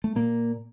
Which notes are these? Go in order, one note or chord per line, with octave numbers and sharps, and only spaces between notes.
A3
A#2 A#3